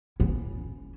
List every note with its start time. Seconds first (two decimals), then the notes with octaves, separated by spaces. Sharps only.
0.20 C#4 E4